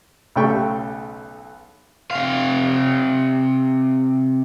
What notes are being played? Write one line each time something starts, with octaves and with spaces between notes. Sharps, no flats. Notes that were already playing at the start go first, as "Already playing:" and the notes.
B1 C#3 A3 G5 C#6
C3 F5